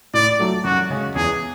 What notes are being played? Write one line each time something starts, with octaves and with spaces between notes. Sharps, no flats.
A2 D5
F#3 A3
F#2 F#4
C#3 G#3 C#4
E2 G#4